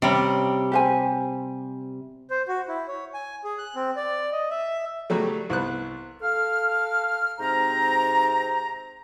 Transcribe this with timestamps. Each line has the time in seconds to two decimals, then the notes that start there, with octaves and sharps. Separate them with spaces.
0.02 C3 G3 C#4
0.72 G4 C5 G#5
2.30 C5
2.48 F#4
2.68 E4
2.88 C#5
3.14 G#5
3.44 G#4
3.58 F#6
3.76 C4
3.96 D5
4.32 D#5
4.51 E5
5.10 C#3 F#3 G3 A3
5.50 C2 B3 F#6
6.22 A4 F5 F6
7.39 G#2 C3 C4 C5 A#5